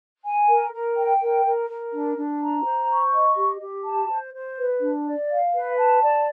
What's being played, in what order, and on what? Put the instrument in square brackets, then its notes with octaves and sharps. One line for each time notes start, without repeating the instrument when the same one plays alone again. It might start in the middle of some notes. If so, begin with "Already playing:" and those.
[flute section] G#5
A#4
A#4
G5
A#4
A#4
A#4
D4
D4
A#5
C5
C#6
D#5
G4
G4
A5
C5
C5
B4
D4
D5
F5
B4
A5
D5